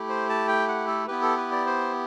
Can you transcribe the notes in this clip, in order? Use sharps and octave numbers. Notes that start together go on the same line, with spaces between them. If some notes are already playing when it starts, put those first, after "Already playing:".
Already playing: A3 E4 G4
C5
A5
G5
F#5
A4
B3 E4 G4 B4
A4
B4
D5
C5